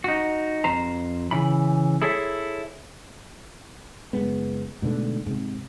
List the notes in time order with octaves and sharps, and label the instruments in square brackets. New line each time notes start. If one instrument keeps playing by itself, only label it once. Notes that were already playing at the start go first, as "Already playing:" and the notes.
[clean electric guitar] D#4 F#4
F2 C5 A#5
C#3 E3 B5
E4 G#4 A4 C5 C#5 E5
[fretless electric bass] F#1 G#3 B3
G#2 B2 D3 A3
G#2 C3